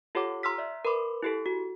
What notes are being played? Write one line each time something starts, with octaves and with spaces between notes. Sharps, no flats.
F4 G4 A4 C#5 F#5 D6
A#5 C6 E6 F6 B6
D5 E5
A#4 B4 B5 C6 D6
E4 G4 A4
F#4